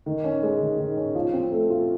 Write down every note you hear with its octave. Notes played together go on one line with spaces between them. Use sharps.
D#3
C#4
G#3
D#3
D#3
C#4
F3
C4
A3
F4